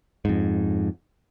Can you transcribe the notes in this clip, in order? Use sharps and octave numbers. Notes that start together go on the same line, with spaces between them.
F2 G#2